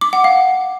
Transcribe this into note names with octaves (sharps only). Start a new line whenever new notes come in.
D6
F#5
F5